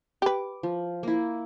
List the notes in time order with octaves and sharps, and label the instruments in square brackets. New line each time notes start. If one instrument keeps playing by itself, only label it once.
[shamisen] G4 B4 [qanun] D6
[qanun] F3
A#3 E4